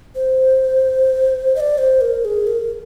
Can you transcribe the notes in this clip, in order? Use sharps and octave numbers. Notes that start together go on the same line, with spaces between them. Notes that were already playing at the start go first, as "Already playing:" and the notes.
C5
D#5
D5
C5
A#4
G#4
A#4